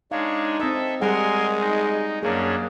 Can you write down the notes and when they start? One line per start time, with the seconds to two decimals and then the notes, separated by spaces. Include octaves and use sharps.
0.12 G#3 D4 D#4 C#5 F5
0.60 C4 A4 D#5 E5
1.01 G3 G#3 G#4 A#4 F#5 G#5 C6
1.60 D#4
2.23 F#2 A#3 C#4 D4 G#4